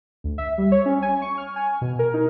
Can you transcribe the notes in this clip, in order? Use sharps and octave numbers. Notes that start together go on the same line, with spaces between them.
D2
E5
G3
C#5
C#4
G#5
C#6
F6
G#5
B2
A#4
D#4